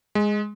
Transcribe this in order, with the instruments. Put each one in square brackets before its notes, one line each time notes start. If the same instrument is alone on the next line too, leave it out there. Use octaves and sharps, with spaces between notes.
[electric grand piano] G#3